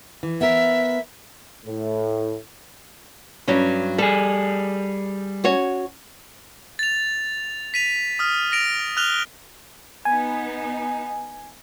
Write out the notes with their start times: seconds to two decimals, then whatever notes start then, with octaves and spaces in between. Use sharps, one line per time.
0.23 E3
0.41 B3 A#4 E5
1.65 A2
3.48 G2 F#3 C#4
3.98 G3 G#4 A4
5.44 C#4 F#4 C#5
6.79 A6 F7
7.74 B6 D#7 F7
8.19 D#6 F6
8.52 A#6 D7 F7
8.97 F6 F#6 F7 G7
10.05 B3 D#4 G#5